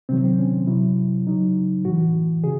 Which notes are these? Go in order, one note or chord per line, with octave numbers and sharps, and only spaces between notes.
C3 D#3 F#3 C4
C4
C#4
C3 F#3 E4
C#3 F#3 D#4
A2 E3 F#4
C#3 G#4